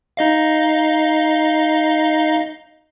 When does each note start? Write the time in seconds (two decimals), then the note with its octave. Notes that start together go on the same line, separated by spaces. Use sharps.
0.17 D#4 D#5 F5